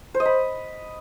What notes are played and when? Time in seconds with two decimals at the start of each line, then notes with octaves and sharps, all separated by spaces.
0.14 C5
0.20 D#5
0.25 B5